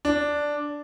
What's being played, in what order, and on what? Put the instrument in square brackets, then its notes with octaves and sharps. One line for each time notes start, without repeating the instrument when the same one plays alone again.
[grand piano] D4